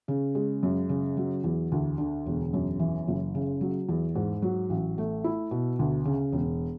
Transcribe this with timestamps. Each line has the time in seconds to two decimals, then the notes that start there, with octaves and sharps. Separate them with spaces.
0.08 C#3
0.35 G#3
0.63 F#2
0.89 C#3
1.17 F#3
1.44 E2
1.72 D2
1.98 D3
2.26 E1
2.53 F#2
2.79 E3
3.08 F#1
3.35 C#3
3.61 F#3
3.89 E2
4.15 G#2
4.42 F#3
4.70 A1
4.98 A3
5.24 E4
5.51 B2
5.79 D2
6.05 C#3
6.32 E1